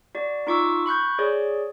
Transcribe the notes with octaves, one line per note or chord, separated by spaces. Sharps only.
F#4 D5
D#4 F4 C#6 D6 E6
B5 C#6 F#6 G6
G#4 C#5 D5